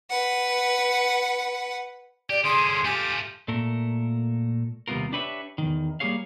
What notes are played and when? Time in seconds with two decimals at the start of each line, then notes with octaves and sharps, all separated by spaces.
0.10 B4 F#5
2.30 G4 D5
2.44 D3 C#4 G#4 C6
2.85 A3 F4 G4 G#5
3.48 A#2 A3 A4 A#4
4.88 D#2 C3 G3 B3 F4 A#4
5.13 D4 G4 B4 C#5 D#5 E5
5.58 E2 G#2 D#3
6.00 G3 A#3 G4 G#4 C#5 F5